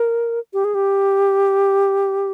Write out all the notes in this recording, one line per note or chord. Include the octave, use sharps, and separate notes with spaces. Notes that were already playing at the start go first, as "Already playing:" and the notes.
Already playing: A#4
G4
G#4
G4